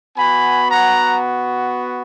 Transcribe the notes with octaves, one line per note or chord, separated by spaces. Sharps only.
B3 F#4 G#5 B5
F#5 A#5